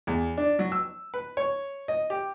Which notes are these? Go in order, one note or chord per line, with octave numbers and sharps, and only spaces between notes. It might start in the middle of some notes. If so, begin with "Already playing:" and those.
E2
D4
F#3
E6
B4
C#5
D#5
G4